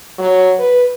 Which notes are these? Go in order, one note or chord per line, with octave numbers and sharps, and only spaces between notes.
F#3
B4